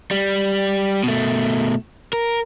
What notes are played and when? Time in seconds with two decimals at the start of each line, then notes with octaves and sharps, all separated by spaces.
0.11 G3
1.04 B2 A3
2.13 A#4